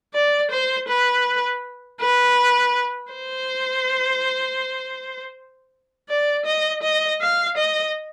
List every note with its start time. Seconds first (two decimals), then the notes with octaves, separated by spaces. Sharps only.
0.14 D5
0.51 C5
0.88 B4
2.01 B4
3.12 C5
6.09 D5
6.46 D#5
6.83 D#5
7.21 F5
7.57 D#5